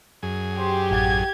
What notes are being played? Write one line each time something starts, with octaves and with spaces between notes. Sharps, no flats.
F#2 G#4
G4 C5
A1 F#5 G#6 A6